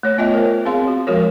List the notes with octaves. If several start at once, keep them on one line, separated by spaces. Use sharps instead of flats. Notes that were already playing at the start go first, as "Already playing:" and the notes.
A3 C#5
B3 F4 C#5 D#5 E5 G5
A#4 C5
C4 G#4 F5 C6
F#4
F3 G#3 F#4 A#4 C#5